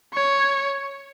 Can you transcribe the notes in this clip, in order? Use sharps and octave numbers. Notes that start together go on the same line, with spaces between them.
C#5